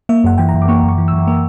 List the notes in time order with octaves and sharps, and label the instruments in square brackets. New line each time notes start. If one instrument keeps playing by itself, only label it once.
[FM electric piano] A#3 E5
F#2 F#5
E3 G5
A#5
F#2
D6
A#3 C#6
F#2
C#6
E3
E6
F#2
A#3